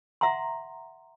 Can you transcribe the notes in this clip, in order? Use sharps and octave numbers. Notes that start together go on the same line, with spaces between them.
E5 F#5 A#5 C6